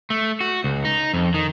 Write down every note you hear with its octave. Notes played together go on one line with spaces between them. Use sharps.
A3
F#4
C#2
D#4
F2
D#3